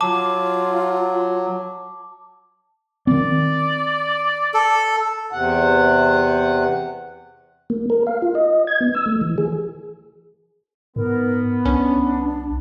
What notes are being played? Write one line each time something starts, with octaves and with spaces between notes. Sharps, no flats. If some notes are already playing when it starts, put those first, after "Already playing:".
F#3 F4 A5 D6
D#3 C4 D5
A4
E2 C3 F#5
A#3
A#4
F5
F4
D#5
G#6
B3
E6
A3
E3
G#4
G#2 B3 A#4
C2 C#4 D4